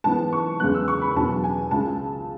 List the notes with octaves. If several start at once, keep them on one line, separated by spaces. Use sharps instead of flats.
G#2 E3 B3 A5
C#6
E2 C#3 G#3 B3 F#6
E6
C#6
B5
E2 B2 F#3 B3 A5
G#5
C#2 C#3 G#3 A5